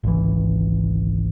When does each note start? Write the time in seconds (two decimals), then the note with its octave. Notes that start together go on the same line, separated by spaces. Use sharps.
0.04 G#1 C#2 E3